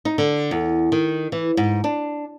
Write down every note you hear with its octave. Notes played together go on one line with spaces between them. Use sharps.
D#4
D3
E2
D#3
E3
G#2
D4